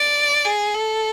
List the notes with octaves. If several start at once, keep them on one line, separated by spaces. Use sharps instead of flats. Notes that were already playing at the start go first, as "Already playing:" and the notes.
Already playing: D5
G#4
A4